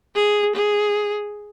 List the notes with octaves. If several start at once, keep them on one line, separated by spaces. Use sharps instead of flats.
G#4
G#4